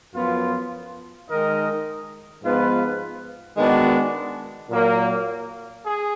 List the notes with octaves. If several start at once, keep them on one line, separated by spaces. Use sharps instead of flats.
F#2 F3 B3 F4
D#3 G#3 D#4 A#4 D#5
G#2 F3 B3 F4 B4
D#3 G#3 B3 D4 F#4
A#2 F#3 A#3
G#4